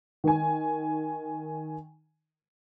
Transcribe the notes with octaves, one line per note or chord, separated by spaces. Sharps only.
D#3 G#5